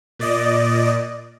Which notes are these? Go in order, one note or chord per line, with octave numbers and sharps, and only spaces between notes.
A#2 D5 D#5